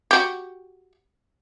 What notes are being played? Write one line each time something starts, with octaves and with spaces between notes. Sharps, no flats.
F#4 G4